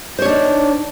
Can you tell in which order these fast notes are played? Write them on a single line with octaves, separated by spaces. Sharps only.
C5 C#5 D4 D#4